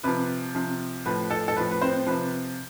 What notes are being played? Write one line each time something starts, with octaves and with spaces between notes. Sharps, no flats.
C3 F3 B4
C3 F3
A2 F3 B4
A4
A4
A2 F3 B4
B4
C4 C5
C3 F3 B4